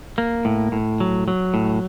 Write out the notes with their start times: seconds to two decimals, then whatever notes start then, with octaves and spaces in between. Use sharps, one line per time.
0.18 A#3
0.45 A2
0.72 A2
1.00 F#3
1.28 F#3
1.54 A2